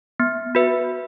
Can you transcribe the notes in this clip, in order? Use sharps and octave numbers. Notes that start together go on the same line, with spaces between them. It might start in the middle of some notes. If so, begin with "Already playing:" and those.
B3
F#4 B4 E5